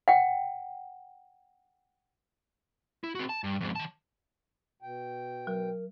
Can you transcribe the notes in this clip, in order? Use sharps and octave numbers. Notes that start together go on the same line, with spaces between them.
F#5 G5
E4
C4 F#4
A5
G2
F2 G#2
D#3 A5
B2 G5
F#3 A#4